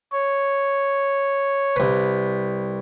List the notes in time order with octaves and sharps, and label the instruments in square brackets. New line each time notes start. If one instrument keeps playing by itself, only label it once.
[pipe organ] C#5
[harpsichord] C2 B4